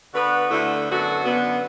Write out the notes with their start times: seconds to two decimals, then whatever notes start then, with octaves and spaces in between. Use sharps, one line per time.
0.14 D3 B3 F#4 B4
0.50 D2 D3 A3 E4
0.87 F#2 D3 B3 F#4 A4
1.24 F#2 D3 B3